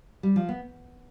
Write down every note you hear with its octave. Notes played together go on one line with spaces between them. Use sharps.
G3
F3
B3